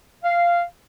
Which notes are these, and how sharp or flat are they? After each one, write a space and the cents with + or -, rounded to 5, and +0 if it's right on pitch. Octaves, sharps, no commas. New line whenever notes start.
F5 -10